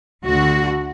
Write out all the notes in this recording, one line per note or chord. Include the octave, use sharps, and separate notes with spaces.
D2 D3 F#4